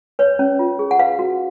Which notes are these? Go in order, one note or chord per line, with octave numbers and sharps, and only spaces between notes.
B4 C#5
C#4
F4
G#4
F#5
B4 F5
F#4